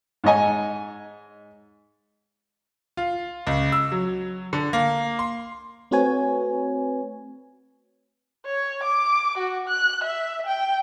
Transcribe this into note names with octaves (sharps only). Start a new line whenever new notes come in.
G#2 C#5 D#5 G#5
F4
C#2
E6
F#3
D3
A#3
C6
A3 C4 F#4 B4 C#5 G#5
C#5
D6
F#4
F#6
E5
G5